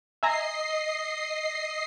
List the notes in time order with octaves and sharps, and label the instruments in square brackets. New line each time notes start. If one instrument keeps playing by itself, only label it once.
[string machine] D#5 C7 [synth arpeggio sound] E5 G#5 A#5